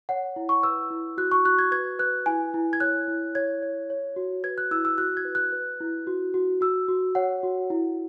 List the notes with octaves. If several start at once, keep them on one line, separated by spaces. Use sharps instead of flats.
C#5 F#5
E4
C#6
B4 E6
E4
F#4 F#6
C#6
F#4 F#6
G#6
B4 G#6
B4 F#6
E4 G#5
E4
G#6
C#5 F#6
E4
C#5 G#6
C#5
C#5
F#4
B4 G#6
F#6
E4 E6
E6
F#4 F#6
G#6
B4
F#6
B4
E4
F#4
F#4
F#4 E6
F#4
C#5 F#5
F#4
E4